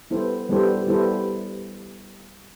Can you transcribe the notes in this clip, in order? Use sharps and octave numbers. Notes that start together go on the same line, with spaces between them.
G3 B3 E4 A4 C5
G3 B3 E4 A4 C5
G3 B3 E4 A4 C5